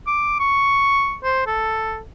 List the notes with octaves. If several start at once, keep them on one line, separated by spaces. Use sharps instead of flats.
D6
C#6
C5
A4